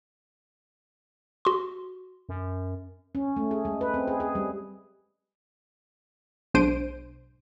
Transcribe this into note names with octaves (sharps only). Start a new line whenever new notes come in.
F#4 C6
F#2
C#4
A3
G#4
G#3
B4
C4
G#4
G#4
G3
B1 G#2 D4 C5 D7 D#7